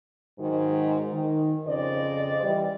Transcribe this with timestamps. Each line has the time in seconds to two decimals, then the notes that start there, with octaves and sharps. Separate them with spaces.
0.39 G#2 D#3 F#3 G#3
1.13 D#3
1.66 F2 C#3 C5 D5 D#5
2.43 E3 G3